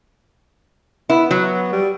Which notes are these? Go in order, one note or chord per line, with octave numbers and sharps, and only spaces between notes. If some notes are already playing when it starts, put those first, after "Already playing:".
B3 E4
F#3
G3